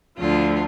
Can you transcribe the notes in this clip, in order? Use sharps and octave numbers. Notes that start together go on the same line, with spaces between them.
D2 D3 F3 F4